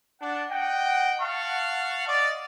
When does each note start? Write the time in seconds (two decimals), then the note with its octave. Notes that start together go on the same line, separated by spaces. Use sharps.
0.20 D4 F#5
0.50 D#5 F#5 G5
1.20 F5 F#5 A5 C#6
2.07 D5 D#5